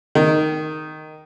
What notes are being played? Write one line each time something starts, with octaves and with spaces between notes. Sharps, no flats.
D#3